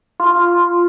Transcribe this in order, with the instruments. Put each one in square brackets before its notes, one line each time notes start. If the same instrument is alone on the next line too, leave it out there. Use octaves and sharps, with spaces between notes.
[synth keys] F4